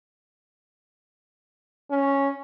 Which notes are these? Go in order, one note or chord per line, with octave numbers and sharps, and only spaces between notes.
C#4